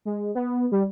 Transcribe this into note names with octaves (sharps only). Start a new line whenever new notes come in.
G#3
B3
G3